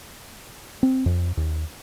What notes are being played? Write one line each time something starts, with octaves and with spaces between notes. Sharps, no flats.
C4
F2
D#2